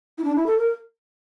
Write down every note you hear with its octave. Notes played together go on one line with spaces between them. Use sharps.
E4
D4
E4
A4
A#4